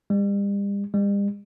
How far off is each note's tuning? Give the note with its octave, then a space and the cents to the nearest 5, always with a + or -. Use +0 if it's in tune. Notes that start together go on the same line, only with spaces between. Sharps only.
G3 +40
G3 +45